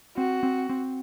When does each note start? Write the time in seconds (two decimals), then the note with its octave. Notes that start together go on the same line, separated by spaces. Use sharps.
0.17 C4 F#4
0.43 C4
0.70 C4